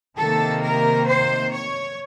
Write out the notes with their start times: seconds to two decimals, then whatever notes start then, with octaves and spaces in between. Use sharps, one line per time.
0.18 C3 D#3 A#3 A4
0.63 A#4
1.09 C5
1.54 C#5